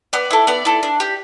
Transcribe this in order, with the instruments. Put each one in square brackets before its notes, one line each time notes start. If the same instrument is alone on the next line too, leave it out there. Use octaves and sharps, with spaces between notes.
[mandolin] B3 D5
E4 A4
B3 D5
E4 A4
D4
G4